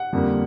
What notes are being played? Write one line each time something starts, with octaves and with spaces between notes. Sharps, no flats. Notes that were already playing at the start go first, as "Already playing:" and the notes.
Already playing: F#5
F2 D3 G3 A#3